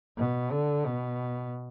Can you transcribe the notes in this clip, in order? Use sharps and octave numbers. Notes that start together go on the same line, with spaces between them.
B2
D3
B2